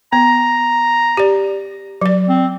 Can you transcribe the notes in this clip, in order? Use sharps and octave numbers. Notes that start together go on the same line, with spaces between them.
B3 A#5
G4 D5
F#3 D5
C4